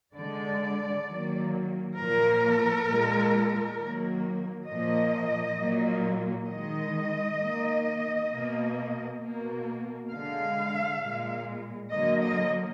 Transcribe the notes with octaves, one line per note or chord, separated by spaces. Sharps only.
D3 G#3 D5
D#3 F#3 A#3
A#2 F3 A#3 A#4
A#2 G#3
D#3 F#3 A#3
A#2 F3 A#3 D#5
A#2 F#3 A#3
D#3 G#3 D#5
D#3 A#3
B2 A#3
B2 A#3
D3 G#3 F5
A#2 G#3
D3 F#3 A#3 D#5
D#5